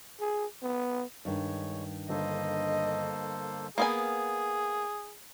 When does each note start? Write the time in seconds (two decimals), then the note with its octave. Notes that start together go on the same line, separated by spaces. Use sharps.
0.20 G#4
0.62 B3
1.25 G2 D#3 G#3 C#5
2.09 G1 A#3 A4 C5 D#5
3.78 A#3 B3 G#4 G#5